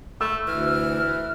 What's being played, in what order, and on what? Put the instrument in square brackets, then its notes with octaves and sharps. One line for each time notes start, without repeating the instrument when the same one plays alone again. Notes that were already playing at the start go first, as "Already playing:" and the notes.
[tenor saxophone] A3 [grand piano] E6
[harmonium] D2 [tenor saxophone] E3 [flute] F6